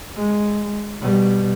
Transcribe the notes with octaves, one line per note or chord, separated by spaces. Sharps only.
G#3
B2 G3